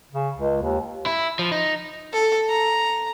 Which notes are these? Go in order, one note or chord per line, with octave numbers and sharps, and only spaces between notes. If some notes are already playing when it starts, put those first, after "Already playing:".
C#3
C#2
D#2
E4
F3
D#4
A4
A#5